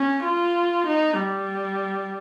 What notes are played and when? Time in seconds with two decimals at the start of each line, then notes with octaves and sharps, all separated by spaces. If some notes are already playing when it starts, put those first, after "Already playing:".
Already playing: C#4
0.24 F4
0.87 D#4
1.19 G3